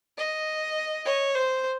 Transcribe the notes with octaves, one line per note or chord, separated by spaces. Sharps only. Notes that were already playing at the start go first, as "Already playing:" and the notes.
D#5
C#5
C5